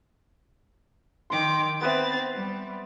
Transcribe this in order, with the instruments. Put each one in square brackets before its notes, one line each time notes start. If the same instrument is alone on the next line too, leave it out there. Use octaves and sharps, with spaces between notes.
[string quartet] D#3 G5 D6 [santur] C6
[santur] B3 B4 E5 [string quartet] C4 A6
[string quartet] G3